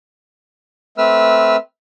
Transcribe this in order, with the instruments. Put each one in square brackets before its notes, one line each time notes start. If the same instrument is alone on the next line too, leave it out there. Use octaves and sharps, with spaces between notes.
[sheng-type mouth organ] A3 C4 B4 E6 F6